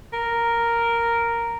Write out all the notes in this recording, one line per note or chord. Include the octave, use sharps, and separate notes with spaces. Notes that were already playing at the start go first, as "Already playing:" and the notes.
A#4